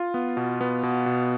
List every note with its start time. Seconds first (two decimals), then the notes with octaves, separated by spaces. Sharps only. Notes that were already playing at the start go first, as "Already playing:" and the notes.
Already playing: F4
0.14 B3
0.37 B2
0.61 B3
0.83 B2
1.06 B2